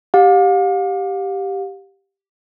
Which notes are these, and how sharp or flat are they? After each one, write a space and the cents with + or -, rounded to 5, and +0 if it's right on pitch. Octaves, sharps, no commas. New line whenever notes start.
G4 +0 F5 +40